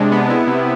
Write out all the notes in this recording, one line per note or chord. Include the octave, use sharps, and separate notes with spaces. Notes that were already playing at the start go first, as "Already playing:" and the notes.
Already playing: C3 G#3 D4
B3
E4
C3